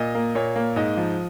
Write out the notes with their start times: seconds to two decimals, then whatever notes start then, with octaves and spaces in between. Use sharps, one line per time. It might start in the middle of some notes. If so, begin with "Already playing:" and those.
Already playing: A#2 D#5
0.15 A#3
0.35 A#2 C#5
0.56 A#3
0.76 G#2 D#5
0.97 F3